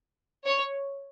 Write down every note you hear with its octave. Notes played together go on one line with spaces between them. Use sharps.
C#5